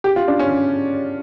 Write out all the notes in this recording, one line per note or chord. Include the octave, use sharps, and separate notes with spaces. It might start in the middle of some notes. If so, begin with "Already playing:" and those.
G4
F4
D4
C#4